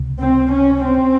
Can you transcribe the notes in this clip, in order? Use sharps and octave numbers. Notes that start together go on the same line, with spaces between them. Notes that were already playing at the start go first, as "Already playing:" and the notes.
Already playing: C#2 C3
C4
C#4
C4